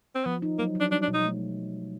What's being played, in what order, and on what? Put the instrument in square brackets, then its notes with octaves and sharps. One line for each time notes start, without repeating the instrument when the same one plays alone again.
[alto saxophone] C4
[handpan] F3 [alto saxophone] B3
[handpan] D#4
[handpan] F#3 [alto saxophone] A#3
[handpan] F#3
[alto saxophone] D4
[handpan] G3 [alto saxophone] D4
[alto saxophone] D4
[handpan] B2
[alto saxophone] D#4
[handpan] A3